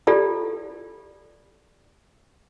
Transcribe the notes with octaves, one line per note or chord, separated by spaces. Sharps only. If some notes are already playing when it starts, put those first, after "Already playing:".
E4 F4 G4 A4 D5